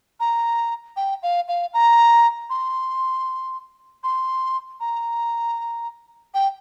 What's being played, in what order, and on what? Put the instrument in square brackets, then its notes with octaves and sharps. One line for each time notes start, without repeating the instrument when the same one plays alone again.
[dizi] A#5
G5
F5
F5
A#5
C6
C6
A#5
G5